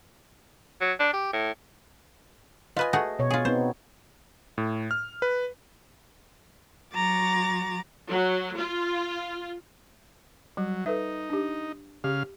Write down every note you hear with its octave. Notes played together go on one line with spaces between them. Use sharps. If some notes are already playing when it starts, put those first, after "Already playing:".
F#3
D4
G4
A2
F4 B4 D#5 G#5
A3 F#4 G#4
B2 C#5
F4 G#4
B3 C4 D#4 C5
A2
F6
B4
F#3 F#4 A#5 D6 A6
F#3
F4
F#3 G3
D#4 A4 B4 E5
D4 G4
C#3 G4 F5